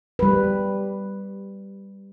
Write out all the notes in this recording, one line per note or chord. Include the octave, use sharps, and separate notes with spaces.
G3 B4